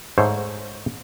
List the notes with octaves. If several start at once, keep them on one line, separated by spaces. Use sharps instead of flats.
G#2 A3 C5 C#5